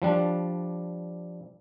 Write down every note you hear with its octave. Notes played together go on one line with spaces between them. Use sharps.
F3 G3 D4